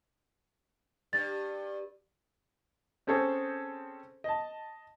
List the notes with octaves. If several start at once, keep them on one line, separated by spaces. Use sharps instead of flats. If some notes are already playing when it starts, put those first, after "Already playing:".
G2 A6
C4 C#4 G#4 A4 C5 C#5
D#5 A5